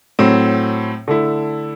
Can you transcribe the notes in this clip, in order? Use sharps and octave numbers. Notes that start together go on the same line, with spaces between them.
A2 F#3 C4
D3 A3 E4